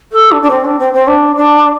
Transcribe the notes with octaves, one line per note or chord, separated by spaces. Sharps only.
A4
D4
D4
C4
D4
C4
C4
D4
D4